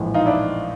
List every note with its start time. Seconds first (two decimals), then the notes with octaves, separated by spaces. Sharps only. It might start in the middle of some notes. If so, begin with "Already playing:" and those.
Already playing: A#1 A2 E3 G#3
0.14 D#4 F4
0.26 D4 E4